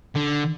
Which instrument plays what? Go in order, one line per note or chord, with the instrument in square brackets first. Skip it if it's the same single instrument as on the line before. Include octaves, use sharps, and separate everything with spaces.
[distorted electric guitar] D3